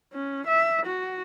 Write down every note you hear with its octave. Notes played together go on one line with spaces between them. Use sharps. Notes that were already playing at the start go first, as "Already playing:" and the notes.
C#4
E5
F#4